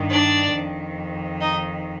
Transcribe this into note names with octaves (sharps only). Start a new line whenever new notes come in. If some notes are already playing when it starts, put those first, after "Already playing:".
Already playing: G2 D#3
D4 D5
F2 D#3
D#4 D#5